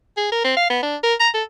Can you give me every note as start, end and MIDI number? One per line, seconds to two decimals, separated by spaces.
0.17 0.30 68
0.32 0.44 70
0.44 0.52 60
0.57 0.68 77
0.70 0.80 59
0.83 0.96 62
1.03 1.14 70
1.20 1.29 82
1.34 1.43 69